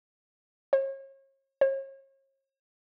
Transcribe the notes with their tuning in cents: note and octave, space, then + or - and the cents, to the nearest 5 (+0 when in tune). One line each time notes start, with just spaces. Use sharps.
C#5 -40
C#5 -40